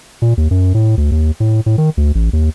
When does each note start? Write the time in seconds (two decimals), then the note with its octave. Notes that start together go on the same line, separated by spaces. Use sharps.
0.22 A#2
0.37 D#2
0.51 F#2
0.74 A2
0.97 D2
1.12 D#2
1.40 A2
1.66 A2
1.78 D#3
1.97 D2
2.15 A1
2.33 D#2